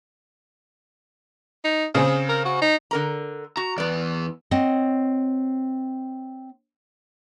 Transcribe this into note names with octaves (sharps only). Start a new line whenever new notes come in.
D#4
C#3 C4 G#4
A#4
F#4
D#4
D3 A#4 A#5
F#4 A#5
E2 B3 B4 D5
C4 C#5 D#5 F#5